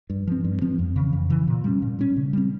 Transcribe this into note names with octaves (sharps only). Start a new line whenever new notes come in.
G2
F3 C4
G2
F3 C4
F2
C#3 E3
F2
C#3 E3
A#2
G3 C#4
A#2
G3 C#4
C#3
G3 C4